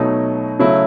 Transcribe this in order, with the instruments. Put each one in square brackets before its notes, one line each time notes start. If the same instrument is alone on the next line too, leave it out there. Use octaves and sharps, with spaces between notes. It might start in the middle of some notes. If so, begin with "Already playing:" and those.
Already playing: [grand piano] B2 F#3 A3 D#4
C#3 F#3 A3 E4